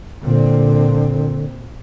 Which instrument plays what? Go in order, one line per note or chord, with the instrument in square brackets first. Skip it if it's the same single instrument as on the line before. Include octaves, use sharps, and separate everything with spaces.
[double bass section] A#2 C4 [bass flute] D3